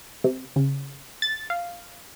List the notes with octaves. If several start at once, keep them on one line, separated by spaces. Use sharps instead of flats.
C3
C#3
A6
F5